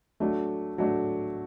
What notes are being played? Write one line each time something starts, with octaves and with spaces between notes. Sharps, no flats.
F#3 A3 D4
F#3 A3 D4